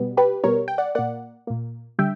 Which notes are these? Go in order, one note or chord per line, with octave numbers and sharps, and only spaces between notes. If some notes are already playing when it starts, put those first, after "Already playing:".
Already playing: B2 G3 B3
G4 B4
B2 G3 B3 A#4 C#5
G5
D5 F#5
A#2 A#3 D5 F#5
A#2 A#3
D3 G3 E5 G5